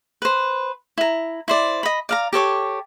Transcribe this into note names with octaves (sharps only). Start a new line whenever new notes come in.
B4 C5
E4 A#5
E4 C5 D5
D#5 B5
D5 F5 A#5
G4 A4 C#5 D6